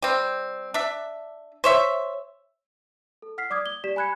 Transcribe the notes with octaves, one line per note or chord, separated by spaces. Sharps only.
G3 C4
D4 E5
C5 C#5 E5
A4
F#5 F6 B6 C7
D5 D6 D#6 G#6
G7
G4 D5 B6 E7
G#5 B5 F#6 G#6 C#7